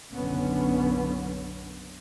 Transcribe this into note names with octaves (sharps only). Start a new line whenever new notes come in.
F#1 B1 D3 F#3 B3 C#4